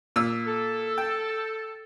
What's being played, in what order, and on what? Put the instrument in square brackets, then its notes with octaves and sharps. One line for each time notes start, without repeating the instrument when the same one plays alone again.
[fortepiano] A#2 E6
[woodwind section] A4
[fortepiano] G5